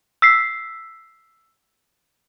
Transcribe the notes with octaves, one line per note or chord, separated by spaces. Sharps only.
E6 B6 C7